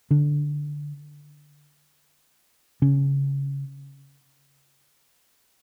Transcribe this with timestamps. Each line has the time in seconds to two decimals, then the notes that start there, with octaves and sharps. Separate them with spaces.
0.11 D3 D4
2.82 C#3 C#4